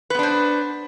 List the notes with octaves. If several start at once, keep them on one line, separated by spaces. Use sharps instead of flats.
B3 D4 B4 C5